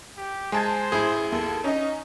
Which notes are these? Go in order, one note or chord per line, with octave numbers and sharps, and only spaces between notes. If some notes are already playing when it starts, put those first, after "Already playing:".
G4
G#3 C5 G#5 A5 G#6
A1 E4 G#4
D#2 A4
C#4 D#4 D#5